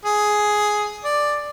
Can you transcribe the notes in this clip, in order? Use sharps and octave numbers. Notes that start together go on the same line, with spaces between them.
G#4
D5